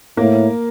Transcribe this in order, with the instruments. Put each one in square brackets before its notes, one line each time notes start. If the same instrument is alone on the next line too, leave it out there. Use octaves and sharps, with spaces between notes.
[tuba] A2 [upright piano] A#3 A#4